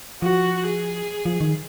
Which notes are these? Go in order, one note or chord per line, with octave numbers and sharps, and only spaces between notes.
F3 F#4
G#4
F3
D#3